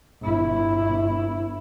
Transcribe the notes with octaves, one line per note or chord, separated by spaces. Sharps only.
G1 E4